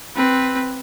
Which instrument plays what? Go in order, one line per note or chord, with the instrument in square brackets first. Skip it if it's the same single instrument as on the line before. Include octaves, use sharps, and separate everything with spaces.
[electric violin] C4 B4